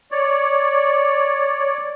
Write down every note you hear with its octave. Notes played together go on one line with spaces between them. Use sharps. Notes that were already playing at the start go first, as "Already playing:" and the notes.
C#5 D5